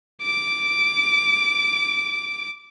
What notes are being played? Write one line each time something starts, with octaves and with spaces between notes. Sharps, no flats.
D6 D7